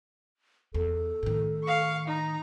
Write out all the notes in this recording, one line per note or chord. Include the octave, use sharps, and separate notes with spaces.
E2 A4
A2 D#3
F5 C#6
D#4 A#5